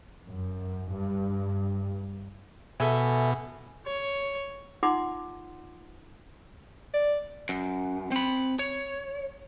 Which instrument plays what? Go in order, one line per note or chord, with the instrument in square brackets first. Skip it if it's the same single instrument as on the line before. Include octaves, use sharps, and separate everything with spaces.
[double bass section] F#2
G2
[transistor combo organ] B2 [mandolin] A4 E5 G#5
[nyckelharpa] C#5
[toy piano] D#4 F4 F#5 C6 D6
[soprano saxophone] D5
[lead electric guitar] F#2
C4 B5
C#5